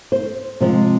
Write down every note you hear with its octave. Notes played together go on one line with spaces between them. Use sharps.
C5
C3 F3 G#3 C4